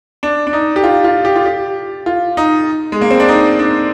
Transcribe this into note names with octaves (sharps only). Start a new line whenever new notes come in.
D4
D4
D#4
G4
F4
F4
G4
F4
G4
F4
D#4
G#3
A#3
C4
D4
D#4
D4